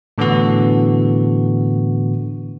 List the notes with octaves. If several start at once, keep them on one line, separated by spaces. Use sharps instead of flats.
A2 D3 E3 B3 F#4